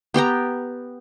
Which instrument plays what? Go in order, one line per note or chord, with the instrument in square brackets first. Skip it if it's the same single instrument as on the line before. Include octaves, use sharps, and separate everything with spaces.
[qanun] B3 G4 G5 A#5